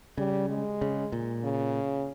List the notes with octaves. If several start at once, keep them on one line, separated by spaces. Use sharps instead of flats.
C#3 G3
G#3
C#3
A#2
C#3